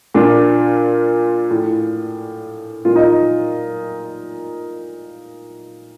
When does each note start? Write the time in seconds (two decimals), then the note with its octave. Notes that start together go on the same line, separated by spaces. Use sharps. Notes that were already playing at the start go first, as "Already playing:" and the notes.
0.14 A#2 D4 F4
1.51 A2
2.85 A#2 F4
2.96 D#4